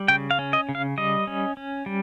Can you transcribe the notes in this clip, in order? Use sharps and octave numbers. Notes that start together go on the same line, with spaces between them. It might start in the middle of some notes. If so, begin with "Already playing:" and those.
Already playing: G3
C#3 G5
F5
C#4
D#5
C#3
F5
G3 D#5
C#4
C#4
G3